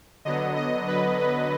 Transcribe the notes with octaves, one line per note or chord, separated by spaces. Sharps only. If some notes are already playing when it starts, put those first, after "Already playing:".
D3 F#3 B3 D#5
D#5
B4
B4